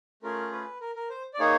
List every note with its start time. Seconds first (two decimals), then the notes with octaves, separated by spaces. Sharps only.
0.23 A3 C#4 F4 G#4 A#4
0.52 B4
0.81 A#4
0.95 A#4
1.10 C5
1.34 D5
1.40 A#3 D#4 G#4 C#5